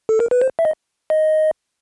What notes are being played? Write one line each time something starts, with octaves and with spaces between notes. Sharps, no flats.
A4
A#4
B4
C5
E5
D#5
D#5